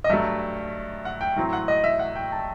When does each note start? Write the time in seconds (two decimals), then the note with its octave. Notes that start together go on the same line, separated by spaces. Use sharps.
0.04 D#5
0.10 G2 F#3 A3 E5
1.05 F#5
1.21 G5
1.36 A2 F#3 C4
1.53 F#5
1.68 D#5
1.84 E5
1.99 F#5
2.16 G5
2.32 A5